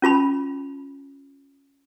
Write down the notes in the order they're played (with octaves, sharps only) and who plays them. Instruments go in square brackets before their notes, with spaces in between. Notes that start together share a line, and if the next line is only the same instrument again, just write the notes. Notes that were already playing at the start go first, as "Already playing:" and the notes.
[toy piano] C#4 F4 A5 B5